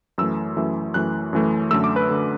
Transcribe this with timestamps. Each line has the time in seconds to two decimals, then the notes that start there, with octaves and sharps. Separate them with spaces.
0.18 F#2 E3 A3 E6
0.57 F#2 E3 A3
0.94 F#2 E3 A3 F#6
1.33 F#2 E3 A3
1.71 F#2 D3 A3 E6
1.84 D6
1.96 B4
2.09 D3 A3